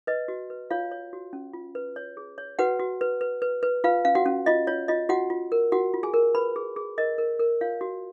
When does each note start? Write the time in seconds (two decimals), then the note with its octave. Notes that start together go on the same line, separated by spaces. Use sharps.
0.07 B4 D#5
0.28 F#4
0.50 B4
0.71 F4 C#5 F5
0.91 C#5
1.13 F#4
1.33 C#4
1.54 F4
1.75 B4
1.96 C#5
2.17 G#4
2.38 C#5
2.59 F#4 B4 F#5
2.80 F#4
3.01 B4
3.21 B4
3.42 B4
3.63 B4
3.84 F4 B4 F5
4.05 C#4 F5
4.15 F#4 F#5
4.26 C#4
4.46 F4 D#5
4.67 F4 C#5
4.88 F4 D#5
5.09 F4 F#4 F#5
5.30 F4
5.52 A#4
5.72 F4 F#4 F#5
5.94 F4
6.03 G#4 G#5
6.14 A#4
6.35 B4 B5
6.56 G#4
6.76 G#4
6.98 A#4 D#5
7.18 A#4
7.40 A#4
7.61 F4 C#5 F5
7.81 F#4